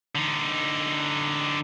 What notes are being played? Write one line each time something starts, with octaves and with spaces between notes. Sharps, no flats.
D3 D#4